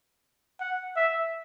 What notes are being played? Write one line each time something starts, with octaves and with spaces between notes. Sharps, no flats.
F#5
E5